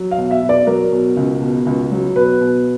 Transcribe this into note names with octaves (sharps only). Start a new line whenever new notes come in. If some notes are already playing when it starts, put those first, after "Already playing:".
Already playing: F#3
F5
B2
E5
B2
D5
F#3 A#4
B2
C#2
B2
C#2
F#3
B2 B4
B2